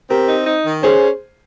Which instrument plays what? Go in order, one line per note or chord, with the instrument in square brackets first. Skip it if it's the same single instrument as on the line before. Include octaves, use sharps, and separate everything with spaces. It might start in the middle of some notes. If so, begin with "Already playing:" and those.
[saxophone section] C4 [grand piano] G4 A#4
[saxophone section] D#4
D#4
D#3
[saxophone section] C#4 [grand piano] G#4 C5